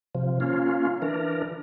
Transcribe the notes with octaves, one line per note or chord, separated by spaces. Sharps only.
C3 F3
A#3 C#4 F4
E3 D4 A#4